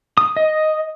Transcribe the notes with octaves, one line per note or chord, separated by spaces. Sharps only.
D#6
D#5